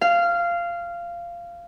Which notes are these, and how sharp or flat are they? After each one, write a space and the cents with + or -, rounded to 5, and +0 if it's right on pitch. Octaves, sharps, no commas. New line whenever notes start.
F5 -15